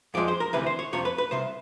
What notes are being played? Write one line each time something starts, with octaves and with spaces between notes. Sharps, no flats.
F2 D3 F3 G#3 D5
C5
A#4
D2 C3 E3 B4
C5
C#5
F2 C3 F3 C#5
B4
B4
C2 C3 C5